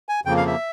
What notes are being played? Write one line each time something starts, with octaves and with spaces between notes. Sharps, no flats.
G#5
F2 C#3 F3 A#3 G5
F5
E5